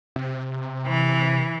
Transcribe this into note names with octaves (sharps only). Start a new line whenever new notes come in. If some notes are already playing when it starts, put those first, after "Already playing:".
C3
E3